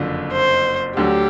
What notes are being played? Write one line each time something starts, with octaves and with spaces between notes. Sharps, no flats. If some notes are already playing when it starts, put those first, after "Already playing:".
Already playing: F#1 F2 D3
C5
D2 D3 F#3 G4